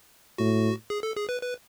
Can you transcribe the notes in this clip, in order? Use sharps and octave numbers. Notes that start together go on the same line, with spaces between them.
A2 F#4
G#4
A4
G#4
B4
B4